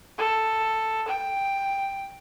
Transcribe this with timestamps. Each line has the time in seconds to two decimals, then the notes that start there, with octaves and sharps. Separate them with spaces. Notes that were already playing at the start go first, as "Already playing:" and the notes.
0.18 A4
1.08 G5